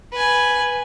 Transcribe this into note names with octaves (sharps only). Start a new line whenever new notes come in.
B4 G#5